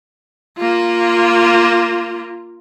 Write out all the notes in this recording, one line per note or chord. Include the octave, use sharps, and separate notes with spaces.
A#3 F4